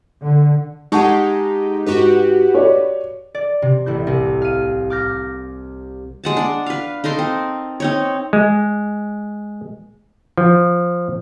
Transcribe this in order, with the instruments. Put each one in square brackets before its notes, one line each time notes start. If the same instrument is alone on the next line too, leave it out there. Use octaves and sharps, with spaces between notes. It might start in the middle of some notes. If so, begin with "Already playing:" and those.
[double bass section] D3
[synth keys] G#3 D#4 G4 [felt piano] F#5 A5 C#6
[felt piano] G#2 [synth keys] F#4 G4 B4
[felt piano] C#5 D5
[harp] D5
C3
A1 E4 G6
C2
F5 D#7
D6 F6 G6 A#6
[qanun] G#3 F#5 A5
D4 D5
B4 F5
D#4 A4 A#4 C6
C4
C4 D#4 C#5
[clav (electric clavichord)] G#3
F3